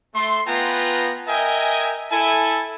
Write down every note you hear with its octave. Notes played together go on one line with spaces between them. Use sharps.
A3 C6
B3 F4 B4 G5 G#5 A#5
A#4 D#5 E5 G5 G#5
E4 A4 G#5